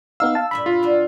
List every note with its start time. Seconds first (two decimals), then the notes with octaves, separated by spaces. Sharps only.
0.20 B3 D#4 F5 E6
0.35 F5 A5
0.51 G2 A#2 E5 B5
0.66 F4
0.83 F#3 D4